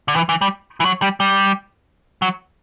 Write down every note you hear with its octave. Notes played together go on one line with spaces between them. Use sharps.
D3
E3
E3
G3
E3
F#3
G3
G3
F#3